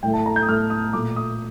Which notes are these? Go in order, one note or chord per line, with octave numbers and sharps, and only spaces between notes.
A2 A3 G5
A5
A#5
G6
D#6
A2 A3 F6
D#6
A#2 A3 D6
D#6